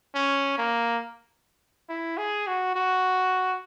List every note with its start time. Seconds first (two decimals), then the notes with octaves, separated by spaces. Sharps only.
0.15 C#4
0.58 A#3
1.89 E4
2.18 G#4
2.47 F#4
2.76 F#4